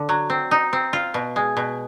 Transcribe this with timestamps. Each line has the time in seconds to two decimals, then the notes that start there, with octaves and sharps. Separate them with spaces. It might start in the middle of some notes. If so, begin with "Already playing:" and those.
Already playing: D3
0.09 F#3
0.30 C4
0.51 D#4
0.73 C4
0.93 F4
1.14 B2
1.36 G#3
1.57 B2